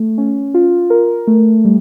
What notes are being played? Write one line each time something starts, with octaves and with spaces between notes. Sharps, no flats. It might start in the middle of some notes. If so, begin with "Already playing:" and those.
Already playing: A3
C#4
F4
A#4
A3
G3